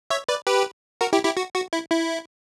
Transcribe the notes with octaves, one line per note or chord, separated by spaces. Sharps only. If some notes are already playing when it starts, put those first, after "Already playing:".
C#5 E5
B4 D5
G4 B4
F#4 A#4
E4 G4
E4 G4
F#4
F#4
E4
E4